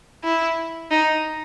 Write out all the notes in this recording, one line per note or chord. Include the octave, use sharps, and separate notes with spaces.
E4
D#4